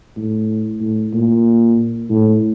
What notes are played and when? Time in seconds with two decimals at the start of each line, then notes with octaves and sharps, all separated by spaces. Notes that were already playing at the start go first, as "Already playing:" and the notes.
0.17 A2
0.80 A2
1.13 A#2
2.10 A2